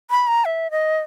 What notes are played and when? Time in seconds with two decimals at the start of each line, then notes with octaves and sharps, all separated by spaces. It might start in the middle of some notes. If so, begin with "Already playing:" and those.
0.10 B5
0.28 A#5
0.45 E5
0.71 D#5